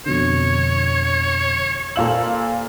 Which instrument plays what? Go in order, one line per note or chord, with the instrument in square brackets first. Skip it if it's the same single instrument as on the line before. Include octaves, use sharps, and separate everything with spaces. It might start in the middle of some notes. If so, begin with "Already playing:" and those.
[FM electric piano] F2 B2 D3 [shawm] C#5
[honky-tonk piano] A#2 F5 F#7 [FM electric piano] A4 C5 E6